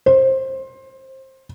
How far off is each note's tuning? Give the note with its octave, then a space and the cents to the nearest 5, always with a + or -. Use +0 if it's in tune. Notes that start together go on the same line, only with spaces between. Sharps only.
C5 +20